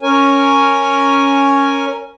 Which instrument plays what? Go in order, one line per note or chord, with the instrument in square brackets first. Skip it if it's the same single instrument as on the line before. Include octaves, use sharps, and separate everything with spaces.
[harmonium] C#4 A#4 C#5 G#5